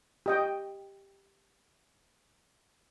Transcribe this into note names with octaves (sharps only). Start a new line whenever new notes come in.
G4 D#5 G5